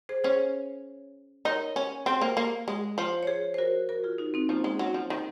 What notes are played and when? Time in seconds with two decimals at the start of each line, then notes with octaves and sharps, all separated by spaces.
0.09 G#4 C5
0.24 C#4 G#4 C5
1.45 D#4 A#4 C#5
1.76 C#4
2.06 C4 G#4 C5
2.21 A#3
2.37 A#3
2.68 G#3
2.98 F3
3.23 C#5
3.27 G#4 C5
3.54 C5
3.58 F#4 A#4
3.89 F#4 A#4
4.04 F4 G#4
4.18 D#4 F#4
4.34 C4 D#4
4.49 F3 A#3 C#4
4.64 G#3
4.79 F#3
4.94 F3
5.10 D#3